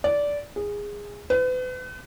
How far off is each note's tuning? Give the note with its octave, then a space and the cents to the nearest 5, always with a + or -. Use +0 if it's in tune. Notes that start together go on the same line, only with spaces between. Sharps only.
D5 -15
G#4 -15
B4 +40